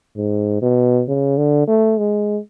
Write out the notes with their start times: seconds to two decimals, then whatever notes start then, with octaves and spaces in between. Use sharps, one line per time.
0.17 G#2
0.62 B2
1.08 C#3
1.37 D3
1.67 A3
1.98 G#3